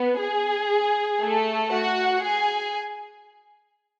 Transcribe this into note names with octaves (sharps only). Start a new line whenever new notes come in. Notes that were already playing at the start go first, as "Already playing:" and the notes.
Already playing: B3
G#4
A3 A4
F#4 F#5
G#4 G#5